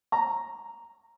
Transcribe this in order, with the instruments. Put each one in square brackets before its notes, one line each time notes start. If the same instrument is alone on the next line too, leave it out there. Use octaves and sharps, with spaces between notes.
[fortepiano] A#5